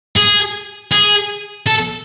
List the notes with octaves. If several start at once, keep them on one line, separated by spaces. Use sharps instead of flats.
G#4
G#4
A4